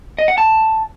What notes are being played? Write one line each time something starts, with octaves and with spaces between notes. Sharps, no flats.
D#5
F#5
A5